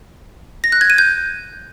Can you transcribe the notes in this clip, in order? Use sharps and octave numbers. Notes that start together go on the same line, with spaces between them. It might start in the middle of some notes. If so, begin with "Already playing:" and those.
A#6
F#6
G#6
D#7
G6